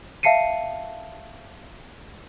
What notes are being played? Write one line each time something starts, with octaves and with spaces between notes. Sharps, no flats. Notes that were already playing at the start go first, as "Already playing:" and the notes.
E5 F5 A5 C7 C#7 D#7